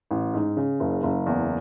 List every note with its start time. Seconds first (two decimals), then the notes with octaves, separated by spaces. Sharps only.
0.11 A1
0.34 G#2
0.57 C#3
0.80 F#1
1.03 F#1
1.27 E2